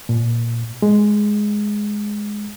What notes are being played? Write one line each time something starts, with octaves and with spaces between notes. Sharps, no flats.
A#2
G#3